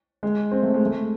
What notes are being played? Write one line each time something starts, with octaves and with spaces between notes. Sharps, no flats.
G#3
C4
A3
G#3
A3